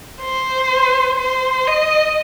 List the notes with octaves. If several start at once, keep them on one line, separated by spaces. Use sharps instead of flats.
C5
C5
D#5